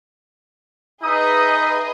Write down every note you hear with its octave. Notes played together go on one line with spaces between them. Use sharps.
D#4 G#4 B4 D#5 E5 D#6